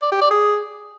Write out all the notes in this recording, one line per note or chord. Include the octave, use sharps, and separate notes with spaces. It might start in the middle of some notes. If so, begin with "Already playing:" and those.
D5
G4
D5
G#4